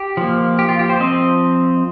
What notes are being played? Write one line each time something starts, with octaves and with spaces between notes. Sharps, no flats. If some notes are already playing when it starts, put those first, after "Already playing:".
Already playing: G4
F3 A#3
G4
F4
G4
C5
F3 C4 D#5